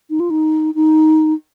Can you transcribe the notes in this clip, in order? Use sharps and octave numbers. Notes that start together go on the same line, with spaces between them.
D#4
F4
D#4
D#4